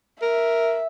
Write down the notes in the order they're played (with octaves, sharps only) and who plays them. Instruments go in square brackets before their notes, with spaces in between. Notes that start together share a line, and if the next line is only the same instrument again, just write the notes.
[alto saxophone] A#4 [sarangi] E5